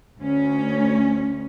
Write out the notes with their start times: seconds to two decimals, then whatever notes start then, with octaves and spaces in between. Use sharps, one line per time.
0.20 D2 C#4